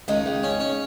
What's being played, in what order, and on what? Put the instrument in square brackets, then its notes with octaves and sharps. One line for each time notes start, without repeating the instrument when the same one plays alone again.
[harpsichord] C#2 [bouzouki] D#3 D#4
[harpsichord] C#2
C#4
C#4